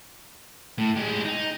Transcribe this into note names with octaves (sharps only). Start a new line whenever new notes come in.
A2
G#3 G4
D#4